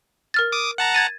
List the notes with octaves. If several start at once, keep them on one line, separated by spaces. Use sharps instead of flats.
A#4 F6 A6
D6 D#6
F#5 A5 A#5
G#6 A6 D#7